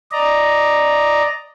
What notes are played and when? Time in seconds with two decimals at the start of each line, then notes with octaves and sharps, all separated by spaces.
0.12 D5 D#5 A#5